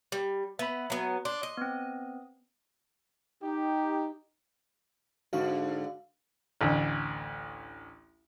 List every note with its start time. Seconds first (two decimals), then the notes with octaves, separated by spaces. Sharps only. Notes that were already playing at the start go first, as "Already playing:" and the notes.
0.12 G3
0.59 B3 E5 B5
0.90 F#3 B3
1.25 D4 C6
1.43 D#5
1.57 B3 C4
3.42 D#4 G4
5.33 G#2 D3 F#4 F5
6.61 A1 D2